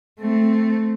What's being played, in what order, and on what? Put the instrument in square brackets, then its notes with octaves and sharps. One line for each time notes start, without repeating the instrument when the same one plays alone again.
[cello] A3 C4